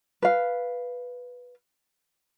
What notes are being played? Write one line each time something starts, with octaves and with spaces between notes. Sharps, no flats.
B4 F5